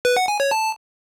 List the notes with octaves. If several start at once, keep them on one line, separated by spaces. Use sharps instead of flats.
B4
F#5
G#5
C#5
A5